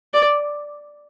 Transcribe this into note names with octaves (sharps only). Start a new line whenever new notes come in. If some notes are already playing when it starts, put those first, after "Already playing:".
D5